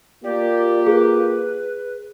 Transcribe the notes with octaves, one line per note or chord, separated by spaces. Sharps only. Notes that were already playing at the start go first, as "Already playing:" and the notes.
A#3 F4 G4 D5
G#4 B4